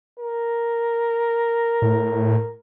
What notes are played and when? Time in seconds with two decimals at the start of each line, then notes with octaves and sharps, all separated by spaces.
0.20 A#4
1.82 A2